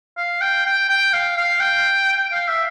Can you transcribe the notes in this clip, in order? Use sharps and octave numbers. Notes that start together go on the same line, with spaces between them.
F5
G5
G5
G5
F5
F5
G5
F5
E5